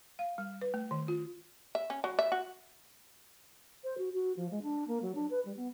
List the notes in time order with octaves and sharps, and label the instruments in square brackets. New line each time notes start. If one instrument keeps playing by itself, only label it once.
[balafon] F5
G3
B4
A3
D#3
F4
[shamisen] E5
C#4
F#3
E5
F#4
[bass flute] C5
F#4
F#4
F3
G#3
D4
A#3
F#3
D4
B4
G3
B3